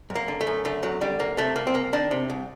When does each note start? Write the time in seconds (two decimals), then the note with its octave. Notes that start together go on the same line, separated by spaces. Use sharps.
0.10 F#2
0.15 A#3
0.28 D3
0.41 A3
0.47 F#2
0.65 D3 A3
0.83 F#2 F#3
1.01 D3 G3
1.19 F#2 A#3
1.37 C3 A3
1.56 C2 A#3
1.67 C4
1.74 C2 A#3
1.93 D#3 D4
2.11 C3
2.30 C2